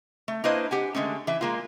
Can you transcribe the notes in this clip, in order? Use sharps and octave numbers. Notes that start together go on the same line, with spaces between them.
A3
A#3 D4 E4 B4 C5 D#5
G4 F#5 G#5
D3 G#3 A3 C#4
E3 E5
G#3 A#3 F4